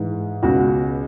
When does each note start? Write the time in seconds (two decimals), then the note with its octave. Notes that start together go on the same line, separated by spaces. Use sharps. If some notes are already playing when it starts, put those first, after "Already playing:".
Already playing: G#2 E3
0.43 C#2 B2 F#4